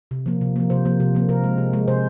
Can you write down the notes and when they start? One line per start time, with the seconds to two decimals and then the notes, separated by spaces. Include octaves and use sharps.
0.11 C3
0.26 F3 A#3
0.41 C3
0.56 F3 A#3
0.70 C3 C5
0.85 F3 A#3
1.00 C3
1.15 F3 A#3
1.29 C3 A#4
1.44 G#3
1.58 C3
1.73 G#3
1.88 C3 C5